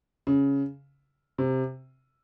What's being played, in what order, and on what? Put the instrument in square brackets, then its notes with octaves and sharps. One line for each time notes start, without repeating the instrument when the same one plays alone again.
[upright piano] C#3
C3